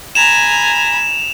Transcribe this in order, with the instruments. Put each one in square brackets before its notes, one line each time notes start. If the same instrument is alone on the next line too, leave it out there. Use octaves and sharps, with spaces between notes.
[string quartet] G#5 A#5 B5 [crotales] E7 F7